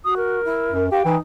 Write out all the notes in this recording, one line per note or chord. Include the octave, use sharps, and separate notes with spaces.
F#4 D#6
A#4
E4
F#2
G4 F5 G5
E3 D#4